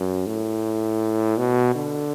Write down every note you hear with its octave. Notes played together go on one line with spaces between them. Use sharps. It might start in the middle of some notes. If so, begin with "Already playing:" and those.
Already playing: F#2
A2
B2
D3